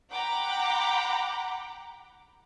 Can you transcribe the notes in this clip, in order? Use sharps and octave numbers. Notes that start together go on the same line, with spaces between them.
F#5 G5 A#5 B5 D6